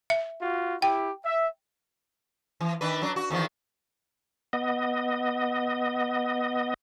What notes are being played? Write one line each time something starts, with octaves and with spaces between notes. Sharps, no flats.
E5
F4 F#4
E4 G4 G5
E5
E3
D#3 D4 B4
F#3 D4
F#4
E2 D#3 F3
B3 D#5